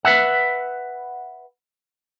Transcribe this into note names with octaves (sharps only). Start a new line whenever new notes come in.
B4 E5 F#5